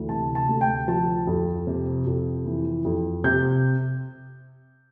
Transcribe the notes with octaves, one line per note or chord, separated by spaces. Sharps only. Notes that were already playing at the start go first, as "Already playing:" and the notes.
Already playing: D2 E3
C3 A5
A5
D2
G5
F3 A5
F2
C3
F2
E3
F2
C3 G6